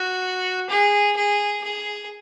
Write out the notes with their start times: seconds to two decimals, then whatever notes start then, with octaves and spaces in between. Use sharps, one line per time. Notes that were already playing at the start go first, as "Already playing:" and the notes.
Already playing: F#4
0.69 G#4
1.16 G#4
1.64 G#4